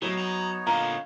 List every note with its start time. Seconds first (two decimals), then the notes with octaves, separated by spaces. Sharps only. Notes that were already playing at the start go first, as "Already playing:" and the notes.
0.02 A2 F#3 B3 D#4 C#5
0.18 G#5 A#5
0.67 A#2 D3 F4 A#5